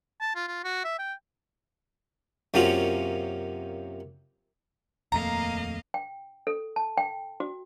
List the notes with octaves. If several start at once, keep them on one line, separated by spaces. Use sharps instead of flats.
A5
F4
F4
F#4
E5
G5
F#2 C3 A#3 C#4 F4 F#4
D#1 F2 A3 A#3 D#5 F5 A#5
G5
A4
A5
G5
F#4